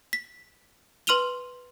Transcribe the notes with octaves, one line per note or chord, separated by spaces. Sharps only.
B6
B4 C6 F6 D#7 F7 G7